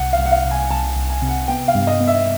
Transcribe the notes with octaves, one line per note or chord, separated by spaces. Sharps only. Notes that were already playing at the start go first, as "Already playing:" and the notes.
Already playing: C2 F#5
F5
C2
F#5
F5
C2
G#5
C2 A5
C2
G#5
C3
F#5
B3 G5
F5
G2
D#5
B3
E5